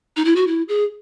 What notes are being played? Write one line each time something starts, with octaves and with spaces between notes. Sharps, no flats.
D#4
E4
F#4
E4
G#4